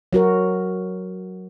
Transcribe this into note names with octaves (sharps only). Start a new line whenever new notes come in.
F#3 F#4 A#4